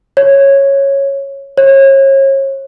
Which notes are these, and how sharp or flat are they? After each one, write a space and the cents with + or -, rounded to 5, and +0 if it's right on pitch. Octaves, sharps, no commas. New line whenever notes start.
C#5 -10
C#5 -35